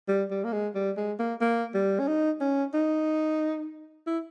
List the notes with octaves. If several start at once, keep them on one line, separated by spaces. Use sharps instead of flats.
G3
G3
A#3
G#3
G3
G#3
A#3
A#3
G3
C#4
D#4
C#4
D#4
E4